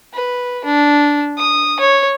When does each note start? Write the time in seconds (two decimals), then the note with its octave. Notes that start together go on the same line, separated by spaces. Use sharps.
0.13 B4
0.65 D4
1.37 D#6
1.80 C#5